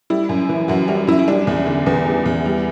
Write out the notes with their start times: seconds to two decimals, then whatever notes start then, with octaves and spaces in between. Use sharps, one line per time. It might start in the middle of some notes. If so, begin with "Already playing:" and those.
0.10 G3 E4
0.29 F#2
0.49 E3
0.68 F#2 F#4
0.88 G3 F#4
1.07 F#2 E4
1.19 E4
1.28 G3 D4
1.47 E2
1.67 D3
1.86 E2 B3
2.06 G3
2.26 E2
2.45 G3